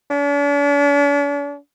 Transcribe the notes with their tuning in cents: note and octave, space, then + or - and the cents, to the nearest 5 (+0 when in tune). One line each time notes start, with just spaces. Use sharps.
D4 -45